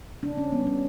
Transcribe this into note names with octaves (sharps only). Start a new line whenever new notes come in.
C#3 D4
C#4
E3 G3 B3
C#4